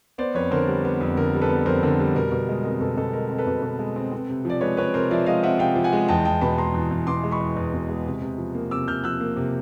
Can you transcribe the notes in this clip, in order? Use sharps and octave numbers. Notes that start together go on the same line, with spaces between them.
B3 C5 D5
F2 B4 C#5
D3 A#4 C5
G3
B3
F2
D3 A#4
G3
A4 B4
B3
F2 A#4 C5
D3 A#4
G3
B2 A#4
B2
G#3
C4 A#4
B2 A4
B2 A4
G#3 A#4
C4
A4 B4
B2
B2
G#3
C4
C4
C3
F3 D5
G#3 B4 C#5
C4 B4 C#5
C3 A#4 C5
F3 D5 E5
G#3 D#5 F5
C4 E5 F#5
C3 F5 G5
F3
F#5 G#5
G#3
E2 G5 A5
E2 G5 A5
B2 A5 B5
G#3 A#5 C6
E2
E2
B2 C6 D6
G#3
B5 C#6
E2
E2
B2
G#3
C3
C3
F3
A#3
C3 D6 E6
C3 F6 G6
F3 E6 F#6
A#3
C3